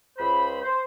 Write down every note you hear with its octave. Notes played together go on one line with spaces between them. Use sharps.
C#2 C5 B5
C5